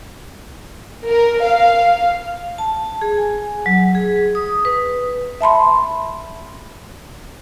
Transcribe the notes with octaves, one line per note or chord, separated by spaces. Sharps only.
A#4
F5
A5
G#4
G#5
F#3
G#4
D#6
B4
E5 A5 B5 C6